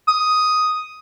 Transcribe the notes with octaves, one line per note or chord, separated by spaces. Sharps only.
D#6